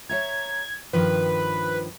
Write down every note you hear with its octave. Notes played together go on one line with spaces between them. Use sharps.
C#5 E5 A#5 G#6
G2 D#3 F3 B4